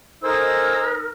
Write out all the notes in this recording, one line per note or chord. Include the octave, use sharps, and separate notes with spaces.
D#4 A4 A#4 C5 G#5 E6